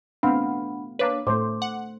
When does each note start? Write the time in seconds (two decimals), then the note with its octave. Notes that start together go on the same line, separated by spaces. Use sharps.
0.23 A3 B3 C4 D4 F5 F#5 B5
0.99 A#3 D4 B4 C#5 F5 D6
1.27 A2 A3 C5 D6
1.62 F#5